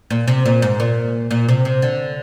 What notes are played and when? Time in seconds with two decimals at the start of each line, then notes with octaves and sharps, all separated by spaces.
0.11 A#2
0.28 C3
0.46 A#2
0.62 G#2
0.80 A#2
1.31 A#2
1.49 C3
1.65 C3
1.82 D3